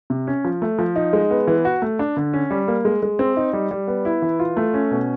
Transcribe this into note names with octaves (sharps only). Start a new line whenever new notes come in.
C3
C#4
F3
A3
F3
D#4
G#3
B3
E3
F#4
A3
D4
D3
C#4
G3
A#3
G#3
G#3
C4
D#4
G3
G3
B3
E4
E3
F4
A3
C#4
B2